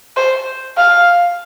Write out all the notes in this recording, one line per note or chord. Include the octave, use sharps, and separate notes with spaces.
C5
F5